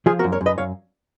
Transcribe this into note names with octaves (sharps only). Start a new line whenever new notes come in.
F3 F4 G#4
F#4 A#4
F#2
A#4 C#5
F#2
B4 D#5
F#2 C#5 F5